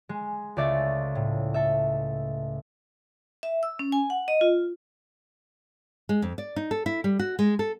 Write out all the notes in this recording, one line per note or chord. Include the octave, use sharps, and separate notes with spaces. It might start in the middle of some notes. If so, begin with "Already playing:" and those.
G#3
C#2 A3 D5 E5 A6
A2
A4 E5
E5
E6
C#4
G#5
F#5
D#5
F4
G#3
F2
D5
D#4
A4
E4
G3
F#4
G#3
A4